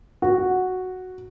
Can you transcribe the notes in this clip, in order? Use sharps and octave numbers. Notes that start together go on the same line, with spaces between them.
F#4